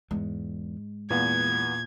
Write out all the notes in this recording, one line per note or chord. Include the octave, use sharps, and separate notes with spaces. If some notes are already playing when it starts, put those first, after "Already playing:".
E2 G#2 G#3
E2 A#2 B3 F5 G#6